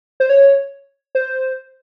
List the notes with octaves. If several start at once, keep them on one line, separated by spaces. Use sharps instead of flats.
C5
C#5
C5